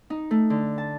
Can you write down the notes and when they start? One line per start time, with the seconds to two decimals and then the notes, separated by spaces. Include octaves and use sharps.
0.10 D#4
0.31 A3
0.50 D3
0.78 A5